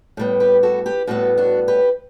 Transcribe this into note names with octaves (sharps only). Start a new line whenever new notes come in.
A2 G3 B3
G4 B4
F#4 A4
G4 B4
A2 G3 B3 F#4 A4
D4 F#4
G4 B4